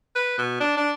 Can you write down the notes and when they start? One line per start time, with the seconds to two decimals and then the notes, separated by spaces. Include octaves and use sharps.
0.15 B4
0.38 B2
0.60 D4
0.77 D4